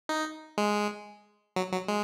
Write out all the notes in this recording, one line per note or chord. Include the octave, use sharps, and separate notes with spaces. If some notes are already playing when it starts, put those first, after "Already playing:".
D#4
G#3
F#3
F#3
G#3